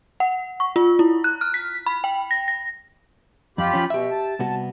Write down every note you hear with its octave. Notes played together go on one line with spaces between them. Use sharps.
F#5
C#6
F4
E4
F#6
F6
B6
B5
G5
A#6
A#6
F2 F4 G4 B5
F3 C#4
B2 G4 E5
A5
C2 B3 F#4